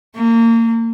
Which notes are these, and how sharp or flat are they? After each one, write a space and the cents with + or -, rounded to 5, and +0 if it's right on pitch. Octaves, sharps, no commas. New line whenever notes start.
A#3 -30